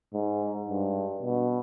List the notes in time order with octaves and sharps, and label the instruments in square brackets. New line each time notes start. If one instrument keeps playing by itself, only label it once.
[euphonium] G#2
G2
B2